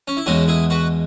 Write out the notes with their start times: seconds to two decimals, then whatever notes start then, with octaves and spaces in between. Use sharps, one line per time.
0.08 C#4
0.17 E4
0.26 E2 B2 G#3 C#4 F#4
0.48 E4 G#4
0.70 F#4 B4